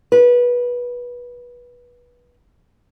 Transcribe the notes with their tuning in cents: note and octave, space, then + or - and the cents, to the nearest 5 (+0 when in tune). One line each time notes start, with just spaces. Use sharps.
B4 -20